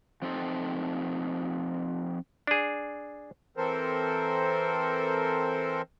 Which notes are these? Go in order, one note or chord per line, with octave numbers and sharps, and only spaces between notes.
F3 C4 D#4 A4
D4 G#4
E3 C4 A4 A#4 C5